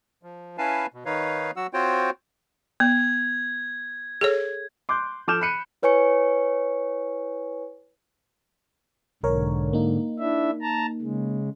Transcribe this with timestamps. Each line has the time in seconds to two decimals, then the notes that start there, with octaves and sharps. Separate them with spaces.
0.23 F3
0.58 C#4 E4 B4 F5 G#5 A5
0.94 B2
1.05 D#3 D#4 B4 C#5 F5
1.56 F#3 F#4 F#5 E6
1.73 C4 F4 F#4 C5 C#5 G5
2.80 B3 G#6
4.21 G#4 A4 C#5
4.89 C6 D6 F#6 G6
5.28 F3 A4 D6 F6 G6 E7
5.41 B5 F#6 C#7 D#7
5.82 E4 B4 C#5 G#5 C#6 C#7
9.23 B1 G#2 D3 A#4 C#5
9.73 A#3 D#4
10.19 D4 E4 E5
10.62 A5 A#5
11.01 C#3 G#3